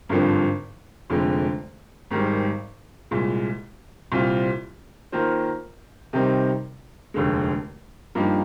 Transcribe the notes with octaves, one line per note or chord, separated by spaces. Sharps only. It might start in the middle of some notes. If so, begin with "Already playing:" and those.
G#1 G2 D3 F3 C4
F1 F2 D3 G#3
G#1 G#2 D#3 G3
C2 A#2 G#3
C2 A#2 G3 C4 F4
D#3 A#3 F4 C5
C3 D#3 G3 C4 D#4
F1 D#2 D3 G#3
G2 F3 A#3 D#4 G4